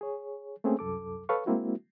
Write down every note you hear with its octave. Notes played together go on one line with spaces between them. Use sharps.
G#4 C#5
A3 A#3 C4 C#4 G#4
C2 F#2 A4 D6
A4 B4 C#5 F5 C#6
G#3 A#3 C4 E4 F#4